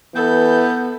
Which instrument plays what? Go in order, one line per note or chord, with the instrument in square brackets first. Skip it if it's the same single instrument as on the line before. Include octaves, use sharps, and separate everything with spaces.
[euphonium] E3 [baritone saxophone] B3 [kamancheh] A4 [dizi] G6